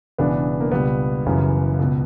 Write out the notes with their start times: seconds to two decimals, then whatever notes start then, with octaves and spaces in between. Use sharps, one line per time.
0.18 E1 E2 C#3 E3 B3 D4
0.60 A#3
0.72 C#2 B2 G3 B3
1.26 F#1 F#2 C#3 E3
1.79 C#2 B2